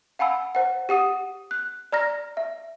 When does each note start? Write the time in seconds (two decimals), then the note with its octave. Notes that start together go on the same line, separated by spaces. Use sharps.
0.19 F5 F#5 G#5 B5 E6
0.55 C5 F#5
0.89 G4 F#5 D#6 D#7
1.51 F#6
1.92 D5 A#5 F6 A#6
2.37 E5